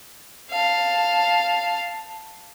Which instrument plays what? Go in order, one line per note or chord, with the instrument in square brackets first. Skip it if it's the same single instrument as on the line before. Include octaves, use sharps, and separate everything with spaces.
[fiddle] F5 A5